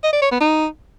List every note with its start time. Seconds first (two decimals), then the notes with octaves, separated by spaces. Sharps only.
0.03 D#5
0.13 D5
0.22 C#5
0.31 B3
0.40 D#4